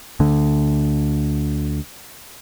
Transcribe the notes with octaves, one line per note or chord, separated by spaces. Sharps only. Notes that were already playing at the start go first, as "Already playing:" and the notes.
D2 D3